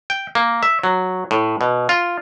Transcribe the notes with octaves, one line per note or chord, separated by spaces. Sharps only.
G5
A#3
E5
F#3
A2
B2
F4